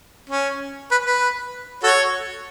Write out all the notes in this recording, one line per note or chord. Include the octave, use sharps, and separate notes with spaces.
C#4
B4
B4
F#4 A4 C#5